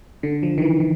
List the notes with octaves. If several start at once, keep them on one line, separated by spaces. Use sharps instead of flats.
D3
F3
D#3
E3
D#3